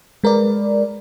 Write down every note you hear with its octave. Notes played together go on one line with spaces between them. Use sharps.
G#3 A#4 B4 D5